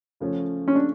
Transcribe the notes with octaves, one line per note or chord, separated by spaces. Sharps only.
C#3 F3 A3 C#4
C#4
D4